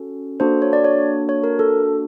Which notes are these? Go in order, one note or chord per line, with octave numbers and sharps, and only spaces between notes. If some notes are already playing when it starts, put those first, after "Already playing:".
Already playing: C#4 F#4 A4
A#3 D4 F#4 A4 C5
C#5
D5
C#5
C#5
A#4
A4